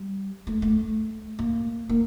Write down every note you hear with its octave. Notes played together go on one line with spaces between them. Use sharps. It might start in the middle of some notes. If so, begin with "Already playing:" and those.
Already playing: G3
A3
A3
A#3
A#3